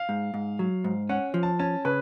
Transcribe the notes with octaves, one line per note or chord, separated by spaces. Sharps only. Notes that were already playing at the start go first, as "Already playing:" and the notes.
Already playing: F5
G#2
G#2
F#3
G#2
C#4 F#5
F3
A5
C#4 A5
C#3 B4